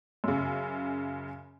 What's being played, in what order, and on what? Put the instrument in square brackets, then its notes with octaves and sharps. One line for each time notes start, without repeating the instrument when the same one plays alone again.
[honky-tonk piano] F#2 C#3